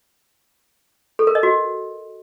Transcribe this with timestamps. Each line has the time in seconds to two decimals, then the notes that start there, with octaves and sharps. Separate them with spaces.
1.19 A4
1.27 A#4
1.35 D#5
1.43 F#4